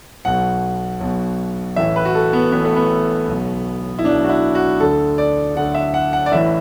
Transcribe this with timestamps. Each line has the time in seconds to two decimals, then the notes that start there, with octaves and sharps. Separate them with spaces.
0.25 B1 B2 F#5
1.01 B1 B2
1.76 A1 A2 E3 E5
1.96 B4
2.05 F#4
2.15 A4
2.33 B3
2.52 A1 A2 E3 B3
2.65 A3
2.76 B3
3.28 B1 B2
3.99 E4
4.04 B1 B2 D4
4.24 F#4
4.29 E4
4.55 F#4
4.80 D2 D3 A4
5.18 D5
5.55 D2 D3 F#5
5.75 E5
5.94 F#5
6.13 F#5
6.26 D5
6.32 A1 A2 E3 E5